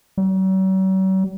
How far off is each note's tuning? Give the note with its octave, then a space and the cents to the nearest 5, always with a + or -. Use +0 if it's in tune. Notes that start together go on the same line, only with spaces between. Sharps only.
F#3 +45